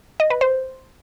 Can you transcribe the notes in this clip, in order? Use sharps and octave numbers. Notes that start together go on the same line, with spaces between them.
D#5
B4
C5